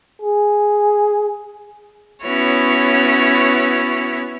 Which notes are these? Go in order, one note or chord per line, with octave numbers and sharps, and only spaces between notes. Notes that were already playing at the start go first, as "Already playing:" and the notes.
G#4
B3 C#4 E4 F#4 C#5